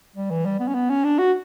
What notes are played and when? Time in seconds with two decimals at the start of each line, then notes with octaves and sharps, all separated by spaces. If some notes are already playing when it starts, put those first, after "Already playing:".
0.16 G3
0.31 E3
0.46 G3
0.60 B3
0.68 C#4
0.75 B3
0.90 C#4
1.04 D4
1.19 F#4